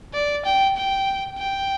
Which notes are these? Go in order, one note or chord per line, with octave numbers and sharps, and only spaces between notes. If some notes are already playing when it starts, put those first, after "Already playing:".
D5
G5
G5
G5